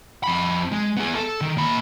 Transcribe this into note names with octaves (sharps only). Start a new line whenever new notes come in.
F2 B5
G#3
B3 G#4
A4
D#3
A#2 B5